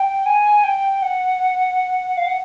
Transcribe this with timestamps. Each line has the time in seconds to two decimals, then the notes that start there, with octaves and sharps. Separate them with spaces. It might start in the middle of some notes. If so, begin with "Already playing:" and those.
Already playing: G5
0.26 G#5
0.64 G5
1.02 F#5
2.17 F5
2.26 F#5